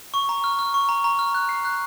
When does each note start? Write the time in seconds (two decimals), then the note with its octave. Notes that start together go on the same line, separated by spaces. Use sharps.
0.14 C#6
0.29 A#5
0.44 F6
0.59 F6
0.74 C#6
0.89 A#5
1.04 A#5
1.19 F6
1.34 F#6
1.49 C7
1.65 F#6